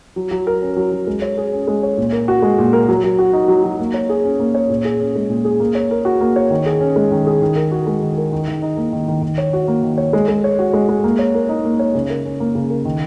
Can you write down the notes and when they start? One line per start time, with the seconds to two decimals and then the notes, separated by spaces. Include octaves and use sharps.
0.16 F#3
0.31 F#3
0.47 A#4
0.62 C#4
0.76 F#3
0.92 F#3
1.07 G#3
1.22 C#5
1.38 G#4
1.53 C#4
1.67 G#3
1.83 C#5
1.98 A#2
2.12 A#4
2.28 F#4
2.42 G#3
2.58 A#2
2.73 A#4
2.88 F#3
3.04 F#3
3.19 F#4
3.33 D#4
3.48 F#3
3.64 F#3
3.80 A#3
3.94 C#5
4.10 G#4
4.24 C#4
4.40 A#3
4.55 C#5
4.70 A#2
4.85 G#4
5.00 C#4
5.15 G#3
5.30 A#2
5.45 G#4
5.60 A#3
5.75 C#5
5.91 A#4
6.05 F#4
6.21 A#3
6.36 C#5
6.50 D#3
6.66 G#4
6.80 C#4
6.96 G#3
7.11 D#3
7.27 G#4
7.42 D#3
7.56 A#4
7.72 F#4
7.87 G#3
8.02 D#3
8.17 A#4
8.32 D#3
8.48 D#3
8.62 D#4
8.77 A#3
8.93 D#3
9.08 D#3
9.23 D#3
9.38 C#5
9.53 F#4
9.68 A#3
9.83 D#3
9.98 C#5
10.13 G#3
10.28 G#3
10.44 C#5
10.59 F#4
10.73 G#3
10.89 G#3
11.04 A#3
11.19 C#5
11.34 A#4
11.49 D#4
11.65 A#3
11.79 C#5
11.95 C#3
12.10 A#4
12.25 C#4
12.40 A#3
12.55 C#3
12.70 A#4
12.85 D#3